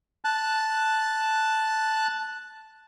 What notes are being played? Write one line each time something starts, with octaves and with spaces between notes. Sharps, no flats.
A5 F#6